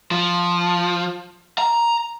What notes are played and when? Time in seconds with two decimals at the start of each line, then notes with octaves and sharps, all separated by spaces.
0.11 F3
1.58 A#5